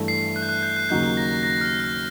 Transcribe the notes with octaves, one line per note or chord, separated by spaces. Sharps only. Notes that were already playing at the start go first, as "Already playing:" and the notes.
Already playing: G2 E3 A3
C7
F#6
G6
F#6
G6
F#6
D#2 C#3 F#3 A#3 D#4 G6
A#6
A#6
F6
F6